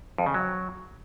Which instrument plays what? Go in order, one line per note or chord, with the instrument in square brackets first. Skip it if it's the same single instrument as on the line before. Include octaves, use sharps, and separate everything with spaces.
[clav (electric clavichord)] F2
C#3
F#3